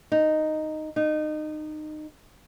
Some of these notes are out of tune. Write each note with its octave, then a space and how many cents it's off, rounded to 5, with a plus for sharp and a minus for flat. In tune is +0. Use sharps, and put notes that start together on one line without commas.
D#4 -5
D#4 -25